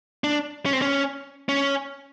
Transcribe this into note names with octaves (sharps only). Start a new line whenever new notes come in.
D4
C#4
C4
C#4
C#4